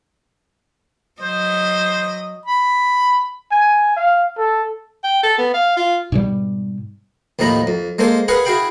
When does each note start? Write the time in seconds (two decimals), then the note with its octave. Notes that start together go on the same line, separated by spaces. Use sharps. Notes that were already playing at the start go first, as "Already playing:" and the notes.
1.21 F#3 C5 D#5
2.46 B5
3.52 G#5
3.96 F5
4.38 A4
5.04 G5
5.23 A4
5.38 B3
5.54 F5
5.77 F4
6.12 G#2 B2 G3
7.39 D#2 A2 F3 D#4 A#5 B5
7.67 F2
7.99 G#3 A#3 A4 C5 G#5
8.28 G#4 A#4 B4 F5 F#5 G#5
8.45 E4 F#4 G#4 F5 G5 B5